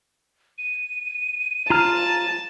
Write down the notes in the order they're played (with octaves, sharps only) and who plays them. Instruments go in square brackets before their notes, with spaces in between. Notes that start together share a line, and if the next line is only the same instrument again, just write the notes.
[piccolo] D#7
[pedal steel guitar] F4 A#5 F6 [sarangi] A5